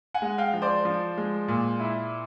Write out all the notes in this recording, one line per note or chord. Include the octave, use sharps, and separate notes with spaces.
F#5 G#5
G#3
F5 G5
F3
C5 D5
F3
G#3
A#2
E4